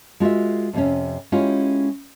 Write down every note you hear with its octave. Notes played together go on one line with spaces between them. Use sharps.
G#3 F4 F#4 A#4 E5
F2 C3 C#4
G#3 C#4 E4 F4 G4